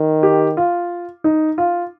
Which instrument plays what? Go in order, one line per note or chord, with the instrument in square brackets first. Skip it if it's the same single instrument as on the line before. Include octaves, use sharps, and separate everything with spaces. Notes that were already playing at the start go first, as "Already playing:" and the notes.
Already playing: [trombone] D#3
[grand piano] G4
F4
D#4
F4